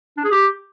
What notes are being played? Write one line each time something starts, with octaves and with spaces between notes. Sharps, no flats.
D4
G#4
G4